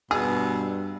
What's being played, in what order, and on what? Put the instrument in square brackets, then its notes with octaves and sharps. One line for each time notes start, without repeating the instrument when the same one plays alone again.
[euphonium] G2 [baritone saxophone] B2 [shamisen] G#4 [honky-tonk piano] E6